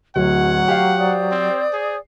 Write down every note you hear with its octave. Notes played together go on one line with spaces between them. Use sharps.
D1 F#3 C#5 F#5
G4 F5
C5 D5 D#6
C4
G#4